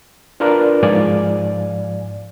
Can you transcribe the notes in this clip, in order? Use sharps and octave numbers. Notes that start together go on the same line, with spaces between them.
D4 F4 A#4 B4 D5
G#2 F3 D5 F5 G#5